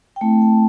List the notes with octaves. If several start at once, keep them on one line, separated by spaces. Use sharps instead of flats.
G5
A3 C4 E4 A5
G5